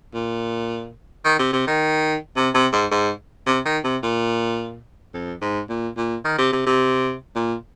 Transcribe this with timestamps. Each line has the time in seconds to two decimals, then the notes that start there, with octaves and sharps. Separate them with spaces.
0.14 A#2
1.25 D#3
1.39 C3
1.53 C3
1.67 D#3
2.36 C3
2.54 C3
2.73 G#2
2.91 G#2
3.46 C3
3.65 D#3
3.84 C3
4.03 A#2
5.14 F2
5.41 G#2
5.69 A#2
5.97 A#2
6.24 D#3
6.38 C3
6.52 C3
6.66 C3
7.35 A#2